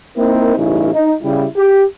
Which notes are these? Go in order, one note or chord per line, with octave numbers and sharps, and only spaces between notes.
A#3 C4 D#4 E4 A#4
A1 G2 C#3 C#4 D#4 E4
D#4
C#3 G3 E4
G4